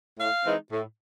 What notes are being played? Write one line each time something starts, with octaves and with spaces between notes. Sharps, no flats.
A2 F5
E3 G#3 C4 D#4
A2